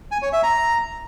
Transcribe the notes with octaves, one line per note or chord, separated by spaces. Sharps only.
G#5
C#5
E5
A#5